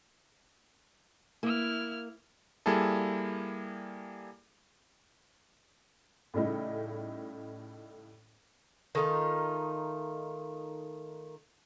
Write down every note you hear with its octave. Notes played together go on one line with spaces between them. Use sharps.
A#3 E4 F6
G3 A#3 E4 G#4 A4
A2 C#3 G3 A3 D#4 E4
D#3 A3 D#4 F4